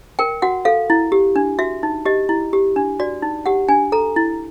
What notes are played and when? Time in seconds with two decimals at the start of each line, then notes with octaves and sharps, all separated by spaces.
0.19 A#4 G5
0.42 F#4 F#5
0.65 A4 F5
0.90 E4
1.12 G4
1.36 D4
1.59 F#4 E5
1.83 D#4
2.06 G4 D#5
2.29 E4
2.53 G4
2.76 D4
3.00 F#4 D5
3.22 D#4
3.46 G4 F#5
3.69 D4 G#5
3.92 A4 A#5
4.16 E4